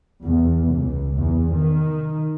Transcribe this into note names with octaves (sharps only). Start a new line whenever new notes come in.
E2
C#2
E2
D#3